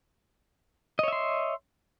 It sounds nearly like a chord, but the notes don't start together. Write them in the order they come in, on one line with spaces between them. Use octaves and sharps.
D#5 C#5 E5 C6